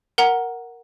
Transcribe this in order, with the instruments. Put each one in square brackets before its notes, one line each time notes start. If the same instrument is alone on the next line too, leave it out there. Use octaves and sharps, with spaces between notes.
[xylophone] A#4 F#5 A#5